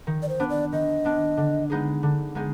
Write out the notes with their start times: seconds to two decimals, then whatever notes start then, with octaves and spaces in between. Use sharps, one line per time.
0.07 D#3
0.22 D5
0.29 C5
0.40 B3 D4
0.50 D5
0.72 D#3 D#5
1.05 B3 D4
1.37 D3
1.70 G#3 B3 D#4 G#4
2.03 D3
2.35 G#3 B3 D#4 G#4